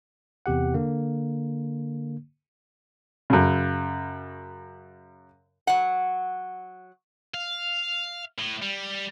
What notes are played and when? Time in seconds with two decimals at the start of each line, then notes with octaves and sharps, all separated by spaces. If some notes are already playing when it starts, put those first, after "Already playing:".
0.46 E2 C3 G4 F#5
0.74 D3 A#3
3.30 F#2 C#3
5.67 F#3 F#5
7.34 F5
8.39 A2
8.62 G3